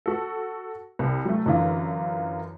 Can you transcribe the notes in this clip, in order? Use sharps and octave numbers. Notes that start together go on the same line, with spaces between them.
F#4 A4
C2
F#3 A3
F#2 D3 E3 F4